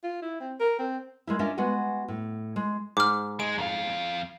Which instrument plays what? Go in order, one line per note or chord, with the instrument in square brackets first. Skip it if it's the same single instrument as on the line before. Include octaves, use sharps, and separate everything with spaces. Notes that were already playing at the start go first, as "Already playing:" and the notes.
[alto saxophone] F4
E4
C4
A#4
C4
[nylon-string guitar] G#3 A#3 E4
C#4 D4 F4 A#4 D#5 E5
G#3 B3 F#4 G#5
A2
G#3
[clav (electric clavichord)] G#2 [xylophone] D6 F6
[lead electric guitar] G#3 [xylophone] D7
[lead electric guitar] F2 F5